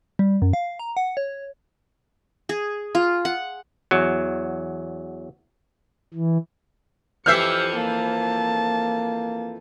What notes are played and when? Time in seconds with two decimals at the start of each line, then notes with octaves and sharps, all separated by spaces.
0.19 G3
0.42 F#2
0.53 F5
0.79 A#5
0.97 F#5
1.17 C#5
2.49 G#4
2.95 F4
3.25 F#5
3.91 E2 F#3
6.14 E3
7.26 F2 E3 G4 E5 F6 G6 C7 C#7
7.75 A#3 A5